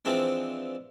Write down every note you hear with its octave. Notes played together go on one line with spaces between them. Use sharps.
E3 F3 G#3 C4 D4